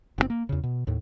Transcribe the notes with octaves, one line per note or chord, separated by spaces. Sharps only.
F#1 A#2 C4
A#3
E2 C#3
B2
D#2 A2